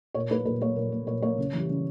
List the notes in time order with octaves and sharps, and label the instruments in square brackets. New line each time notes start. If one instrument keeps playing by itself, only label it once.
[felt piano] A#2 C#5
A#3 B4
A#2 B4
A#3 C#5
A#2
A#3
A#2 C#5
A#3 C#5
C#3
E3 G3
C#3